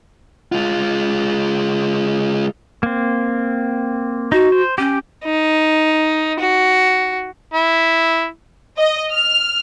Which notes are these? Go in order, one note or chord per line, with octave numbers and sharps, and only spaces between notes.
G#3 F4
A#3 C4
D#4 F#4
C5
C#4 G4 G5
D#4
F#4
E4
D#5
F6